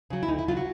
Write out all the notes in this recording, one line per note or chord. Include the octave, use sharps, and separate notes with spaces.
C#3 F#3
E4
D2 D#4
E4
C#3 F#3 F4
F#4